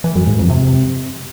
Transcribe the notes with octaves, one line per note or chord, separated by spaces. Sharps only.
E3
F#2
G#2
F2
C3